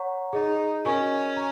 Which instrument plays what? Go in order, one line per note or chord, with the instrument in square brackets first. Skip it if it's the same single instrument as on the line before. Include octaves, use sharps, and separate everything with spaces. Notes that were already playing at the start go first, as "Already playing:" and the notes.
Already playing: [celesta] C#5 F#5 A#5 C#6
[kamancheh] D#4 [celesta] G#4 D#5 A#5
[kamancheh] C#4 [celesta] F#4 A#4 D#5 G#5 C#6
[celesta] A#5